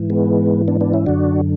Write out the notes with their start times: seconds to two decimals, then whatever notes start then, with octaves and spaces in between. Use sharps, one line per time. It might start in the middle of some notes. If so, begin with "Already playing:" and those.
Already playing: G#2 E3
0.10 G#3 B3
0.68 B3 D4
0.81 B3 D4
0.93 C#4 E4
1.06 F#2 D3 D4 F#4